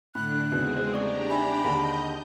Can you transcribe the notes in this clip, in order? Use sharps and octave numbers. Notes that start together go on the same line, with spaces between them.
A2 D3 D4 B5 F#6
E2 C#3 G#3 C4 D#4 F#4 G#4
A3 D4 G4 D5 A#5 C#6
D#4 E5 G#5 B5
D#2 D3 G#4 D#5 A5 G6